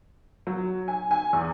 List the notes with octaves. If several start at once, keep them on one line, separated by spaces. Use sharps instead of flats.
F#3
G#5
G#5
E2